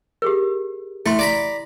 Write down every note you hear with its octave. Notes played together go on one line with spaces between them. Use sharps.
G4 G#4 A#4
A3 E4 C6
D5 A#5 B5